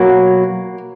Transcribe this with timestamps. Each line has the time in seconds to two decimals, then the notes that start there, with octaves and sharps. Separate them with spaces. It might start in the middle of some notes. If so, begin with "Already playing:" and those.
Already playing: B2 F#3 A#3